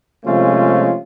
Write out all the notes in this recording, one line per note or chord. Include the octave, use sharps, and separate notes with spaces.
C3 F3 G#3 A3 C#4 F4